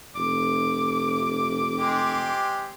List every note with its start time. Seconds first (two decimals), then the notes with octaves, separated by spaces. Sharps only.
0.16 F1 D6
1.78 G#3 C4 G4